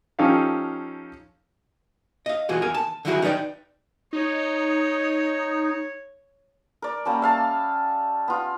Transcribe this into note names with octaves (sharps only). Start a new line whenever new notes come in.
F3 C#4 D#4 G4 A4 F5
D#5 F5
B2 E3 F4 F#4 G#4
E2 A#4 G#5
A5
D3 D#3 F#3 E4 F#4 G#4
D#4 B4 C#5 D5 G5
D#4 C#5
A#4 D5
G3 A#3 C#4 A5
E5 F5 A5
B3 F4